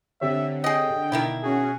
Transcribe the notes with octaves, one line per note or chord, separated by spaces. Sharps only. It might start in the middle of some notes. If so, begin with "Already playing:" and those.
D3 C4 G4 C#5 E5
G#4 D#5 G5
B2 D#3 D4 E4
C#4 F#4 G#4